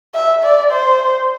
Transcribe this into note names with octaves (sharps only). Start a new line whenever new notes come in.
E5
D5
C5